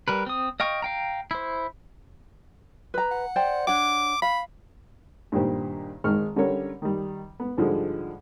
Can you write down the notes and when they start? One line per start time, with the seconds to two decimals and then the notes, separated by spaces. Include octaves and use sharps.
0.08 G3 A#4 B4
0.26 C4 D#6
0.60 D#5 F5 G5 C#6
0.82 F5 G5 A#5
1.31 E4 C5
2.94 B4 A#5
3.11 F#5
3.36 C5 D5 G5
3.67 D4 C#5 F#5 D6
4.22 F5 B5
5.32 G2 A#2 D#3 G4 C5
6.04 G#1 G#2 D#3 G#3 C#6 F6
6.36 D3 G3 C#4 A#4 C#5
6.82 D#3 G3
7.40 B3
7.57 G#2 D3 F3 G3 G#3